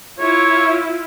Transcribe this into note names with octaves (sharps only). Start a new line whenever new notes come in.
E4 F4 C#5